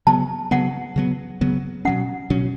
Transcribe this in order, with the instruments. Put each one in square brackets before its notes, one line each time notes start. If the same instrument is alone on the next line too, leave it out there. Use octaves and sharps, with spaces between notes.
[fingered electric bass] C#3 F#3 B3 [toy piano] A5
[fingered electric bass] C#3 F#3 B3 [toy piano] F#5
[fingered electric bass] C#3 F#3 B3
C#3 F#3 B3
[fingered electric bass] B2 F#3 C#4 [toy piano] F#5
[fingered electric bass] B2 F#3 C#4